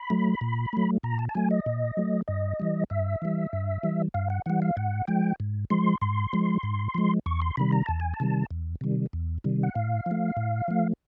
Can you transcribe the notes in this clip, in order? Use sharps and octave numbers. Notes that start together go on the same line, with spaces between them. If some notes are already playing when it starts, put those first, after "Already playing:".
Already playing: B5
F#3 A3
A#2
F#3 A3
A#2 A#5
A5
A5
F#3 A3 G#5
D#5
A#2
F#3 A3
G2 D#5
E3 G3
G2 E5
E3 G3
G2
E3 G3
G2 F5
F#5
E3 G3 F#5
F5
G#2 F#5
F3 G#3 G5
G#2
F3 G#3 C6
G#2 C6
F3 G#3
G#2
F3 G#3
E2 C#6
C6
C3 D#3 G3 B5
A#5
E2 A5
G#5
A5
C3 D#3 G3
E2
C3 D#3 G3
E2
C3 D#3 G3
F#5
A2 F5
F3 A3
A2
F3 A3